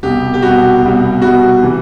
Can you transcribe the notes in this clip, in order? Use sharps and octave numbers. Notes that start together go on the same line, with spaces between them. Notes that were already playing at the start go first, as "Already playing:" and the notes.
C2 B2 G3 G4
G4
C2 B2 G3 F#4
C2 B2 G3
C2 B2 G3 F#4
C3 E3 G3